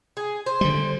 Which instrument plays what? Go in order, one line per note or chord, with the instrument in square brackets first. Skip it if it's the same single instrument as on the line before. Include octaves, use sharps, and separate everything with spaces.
[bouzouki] G#4
C5
[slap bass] D3 G3